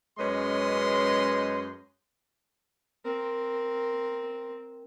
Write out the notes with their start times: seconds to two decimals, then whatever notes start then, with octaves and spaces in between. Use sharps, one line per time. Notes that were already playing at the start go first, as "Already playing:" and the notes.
0.19 F#2 G#3 C#4 B4 D#5 C6
3.04 C4 A#4